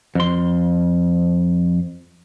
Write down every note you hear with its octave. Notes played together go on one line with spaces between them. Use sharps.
F2 C6